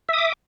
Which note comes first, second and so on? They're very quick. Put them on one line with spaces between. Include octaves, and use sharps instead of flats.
E5 D#6 D6